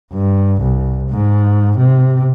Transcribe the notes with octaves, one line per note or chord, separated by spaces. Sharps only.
G2
C2
G#2
C3